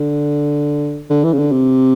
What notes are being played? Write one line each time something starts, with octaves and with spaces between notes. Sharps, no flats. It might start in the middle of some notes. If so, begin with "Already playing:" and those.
Already playing: D3
D3
E3
C#3
D3
C3